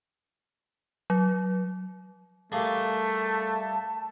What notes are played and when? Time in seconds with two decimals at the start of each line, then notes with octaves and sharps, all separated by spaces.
1.10 F#3
2.52 G3 A3 A#3 G#4 A5